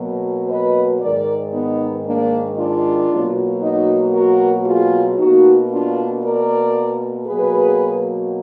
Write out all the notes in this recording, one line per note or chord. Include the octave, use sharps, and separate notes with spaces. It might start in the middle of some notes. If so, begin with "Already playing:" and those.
Already playing: B2 F#3 A#3
B4 D#5
G#2 D#3 G#3 A#4 D5
B3 D#4
A#3 D4
D4 F4
B2 F#3 A#3
D#4 F#4
F#4 A#4
F4 G#4
B2 A#3 D#4 F#4
D4 F4
A#4 D5
B2 F#3 A#3 G#4 B4